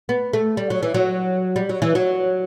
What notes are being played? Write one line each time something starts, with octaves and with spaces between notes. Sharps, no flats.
B3
A3
G3
F#3
E3
F#3
G3
F#3
E3
F#3